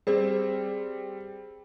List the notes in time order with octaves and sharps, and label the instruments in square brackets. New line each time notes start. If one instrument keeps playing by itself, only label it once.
[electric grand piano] G3 C4 [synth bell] G#4 C5